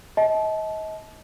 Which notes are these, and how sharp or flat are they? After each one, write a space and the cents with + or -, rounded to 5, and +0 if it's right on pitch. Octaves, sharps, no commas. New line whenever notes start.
D#5 +35 A5 -25